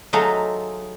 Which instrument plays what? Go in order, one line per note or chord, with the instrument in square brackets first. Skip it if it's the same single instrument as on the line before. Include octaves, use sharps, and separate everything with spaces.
[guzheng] F#3 A3 D#4 F4 G#4 A4